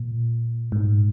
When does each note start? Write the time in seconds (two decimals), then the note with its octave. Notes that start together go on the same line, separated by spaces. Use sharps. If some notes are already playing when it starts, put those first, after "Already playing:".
Already playing: A#2
0.72 G#2